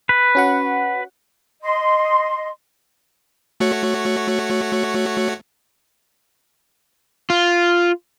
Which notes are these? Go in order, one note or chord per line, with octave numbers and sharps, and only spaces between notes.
B4
C#4 F#4 F#5
D#5 C6
A3 F#4 C#5
F4